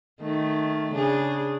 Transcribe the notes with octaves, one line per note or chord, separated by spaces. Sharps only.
D#3 A3
C#3 D4 G#4